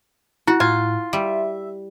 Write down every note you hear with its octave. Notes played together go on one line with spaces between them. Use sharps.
E4 F#4
A2 F4 G#5
G3 E5